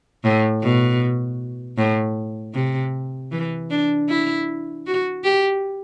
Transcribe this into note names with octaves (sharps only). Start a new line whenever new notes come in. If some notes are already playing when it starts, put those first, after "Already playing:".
A2
B2
A2
C3
E3
D4
E4
F#4
G4